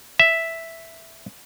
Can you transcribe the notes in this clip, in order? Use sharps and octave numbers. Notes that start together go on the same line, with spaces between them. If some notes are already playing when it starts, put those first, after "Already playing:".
E5